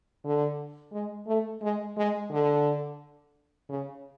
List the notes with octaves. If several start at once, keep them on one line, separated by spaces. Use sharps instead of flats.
D3
G#3
A3
G#3
G#3
D3
C#3